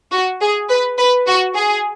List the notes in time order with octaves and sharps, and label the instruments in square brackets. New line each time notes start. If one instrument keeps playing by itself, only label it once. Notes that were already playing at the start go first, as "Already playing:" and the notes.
[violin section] F#4
G#4
B4
B4
F#4
G#4